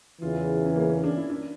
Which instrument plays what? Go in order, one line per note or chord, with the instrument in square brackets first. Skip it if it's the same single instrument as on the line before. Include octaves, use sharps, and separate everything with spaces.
[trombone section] E2 C#3 E3 [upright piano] F4
[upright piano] C#4
A#3
C#4
D4
E4
D4